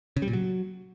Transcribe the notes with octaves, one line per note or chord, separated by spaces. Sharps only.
C#3
G3
A#2
F#3